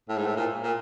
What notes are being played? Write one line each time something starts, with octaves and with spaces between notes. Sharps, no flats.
A2
G#2
A2
A#2
A#2